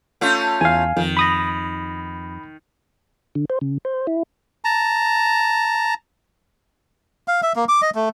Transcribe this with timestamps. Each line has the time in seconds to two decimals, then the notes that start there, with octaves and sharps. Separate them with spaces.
0.21 A3 C#4 F4
0.61 E2 F5 G#5
0.97 F2 D#3
1.17 B5 D#6 A#6
3.35 D3
3.50 C5
3.61 C#3
3.85 C5
4.07 E4
4.65 A5 A#5
7.28 F5
7.43 E5
7.56 A#3
7.69 D6
7.82 D#5
7.95 A3